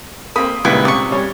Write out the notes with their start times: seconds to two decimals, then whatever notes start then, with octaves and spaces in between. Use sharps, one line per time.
0.36 A#3 C4 B5 D#6
0.65 C#2 A#2 D#3 G3 E4 B4 D#6
0.85 C3 D5 C#6
1.12 G3 C#4 C#5